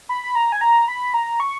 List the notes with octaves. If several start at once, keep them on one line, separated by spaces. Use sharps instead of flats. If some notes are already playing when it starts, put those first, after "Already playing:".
B5
B5
A#5
G#5
A#5
B5
A#5
C#6